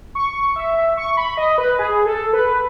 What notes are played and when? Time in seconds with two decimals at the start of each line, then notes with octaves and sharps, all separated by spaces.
0.15 C#6
0.56 E5
0.97 C#6
1.17 B5
1.37 D#5
1.58 B4
1.79 G#4
2.06 A4
2.33 B4